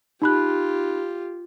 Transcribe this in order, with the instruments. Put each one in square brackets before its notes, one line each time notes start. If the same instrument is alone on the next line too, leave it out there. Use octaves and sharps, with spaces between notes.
[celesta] D#4 B5 F#6 [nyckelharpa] F4 G4